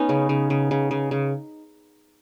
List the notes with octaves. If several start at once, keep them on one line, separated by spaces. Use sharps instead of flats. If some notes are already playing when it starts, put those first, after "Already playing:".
Already playing: B3 C#4 D#4
C#3
C#3
C#3
C#3
C#3
C#3